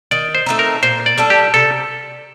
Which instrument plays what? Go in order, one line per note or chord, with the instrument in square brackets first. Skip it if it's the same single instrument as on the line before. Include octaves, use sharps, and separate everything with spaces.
[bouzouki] D#3 [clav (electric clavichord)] D5
[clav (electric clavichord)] C5
[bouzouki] A3 C4 D#4
[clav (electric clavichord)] A#4
[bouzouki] A#2 [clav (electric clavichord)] C5
[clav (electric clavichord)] D5
[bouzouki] G3 D4 A4
[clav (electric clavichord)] G4
[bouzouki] C3 [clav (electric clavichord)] A4